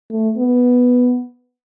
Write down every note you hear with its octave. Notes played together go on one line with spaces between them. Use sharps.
A3
B3